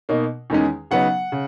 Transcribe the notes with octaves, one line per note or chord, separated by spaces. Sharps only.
B2 A#3 D#4
E2 D#3 G#3 C#4
C#3 F#3 B3 D#4 F#5
C#3